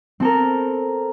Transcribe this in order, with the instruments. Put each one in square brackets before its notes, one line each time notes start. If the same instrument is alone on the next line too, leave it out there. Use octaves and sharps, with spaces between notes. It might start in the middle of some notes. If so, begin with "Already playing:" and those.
[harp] C4 A4 A#4